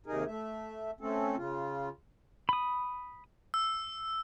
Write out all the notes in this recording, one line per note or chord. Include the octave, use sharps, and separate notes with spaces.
D#2 C3 D#4 G#4 A#4
A3 E5
A3 C4 C#4 A4
C#3 F4
B5 D#6
E6